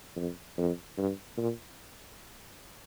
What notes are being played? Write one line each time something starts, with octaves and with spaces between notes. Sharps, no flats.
F2
F2
G2
A#2